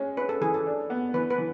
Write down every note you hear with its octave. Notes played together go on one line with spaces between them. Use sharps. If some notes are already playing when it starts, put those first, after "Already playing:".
Already playing: G#3 C#4
C#4 B4
A4
E3 G#4
A4
D4
B3
E3 B4
B4
E3